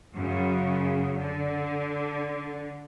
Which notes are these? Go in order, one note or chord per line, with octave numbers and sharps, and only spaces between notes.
F#2 C#3
D3